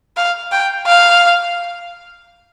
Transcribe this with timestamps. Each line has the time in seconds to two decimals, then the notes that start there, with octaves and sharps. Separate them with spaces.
0.17 F5
0.52 G5
0.87 F5